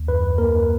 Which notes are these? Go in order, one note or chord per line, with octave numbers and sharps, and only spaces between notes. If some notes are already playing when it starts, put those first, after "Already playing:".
Already playing: D#2
F#2 B4
A#3 A#4